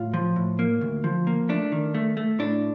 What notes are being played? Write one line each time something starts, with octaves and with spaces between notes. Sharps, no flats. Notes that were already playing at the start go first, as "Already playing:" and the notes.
Already playing: A2 F4
F3
A2
A#3
D2
F3
A#3
A3 D4
D#3
A3
A3
A2 D4